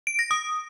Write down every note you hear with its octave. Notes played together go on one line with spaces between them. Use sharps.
D7
A#6
D#6